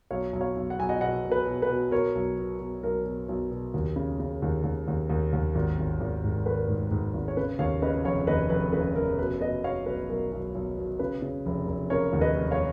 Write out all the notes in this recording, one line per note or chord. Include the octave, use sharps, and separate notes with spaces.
B1 C#5 F5
B1
C#5 F5
B1
F#5
B1 G#5
D#5 F#5
B2 D#5 F#5
B2
B4
B2
B4
B2
B2 A#4 C#5
B1
B2
B2
B1 A#4
B2
B1
B2
D#2
C#3
C#3
D#2
D#2
D#2
D#2
D#2
G#1
G#1
G#1
G#2
D#3 B4
G#2
G#2
G#1
C#5
C#3 B4
D#2 C#5 F5
C#3 B4 D#5
F1 C#5 F5
D#2 B4 D#5
F1 B4
C#3 B4
F1 A#4
B2 B4
B2 B4 D#5
B2 C#5 F5
B1 B4
B1 A#4
B1
B1
B2
C#3 B4
C#3
F1
F1
C#3 A#4 C#5
D#2
B4 D#5
F1
C#5 F5